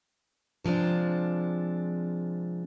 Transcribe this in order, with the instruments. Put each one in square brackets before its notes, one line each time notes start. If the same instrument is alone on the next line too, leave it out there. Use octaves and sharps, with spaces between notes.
[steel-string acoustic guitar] C3 F3 G#3 C4 D4